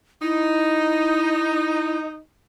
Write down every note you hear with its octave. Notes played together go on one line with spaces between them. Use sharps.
D#4 E4